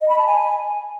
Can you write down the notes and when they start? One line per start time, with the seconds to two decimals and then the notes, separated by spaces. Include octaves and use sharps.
0.01 D#5
0.09 B5
0.18 A5
0.26 G#5